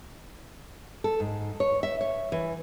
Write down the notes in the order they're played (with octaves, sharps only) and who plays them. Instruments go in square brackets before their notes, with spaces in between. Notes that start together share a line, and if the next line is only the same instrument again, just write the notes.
[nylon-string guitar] A4
G#2
C#5
E5
C#5
E3